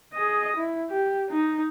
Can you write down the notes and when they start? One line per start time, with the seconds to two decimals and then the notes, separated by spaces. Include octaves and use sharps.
0.13 G#4 D#5
0.56 E4
0.90 G4
1.30 D#4